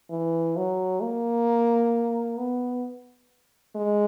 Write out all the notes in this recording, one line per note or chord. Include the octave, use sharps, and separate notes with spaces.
E3
F#3
A#3
B3
G#3